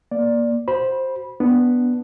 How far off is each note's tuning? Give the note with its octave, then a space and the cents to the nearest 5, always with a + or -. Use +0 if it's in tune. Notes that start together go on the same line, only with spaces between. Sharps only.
A#3 +20 D5 +0
F#4 +5 C5 +5 B5 -20
B3 +0 D4 +0